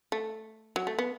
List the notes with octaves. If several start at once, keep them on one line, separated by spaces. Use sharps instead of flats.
A3
F#3
A3
B3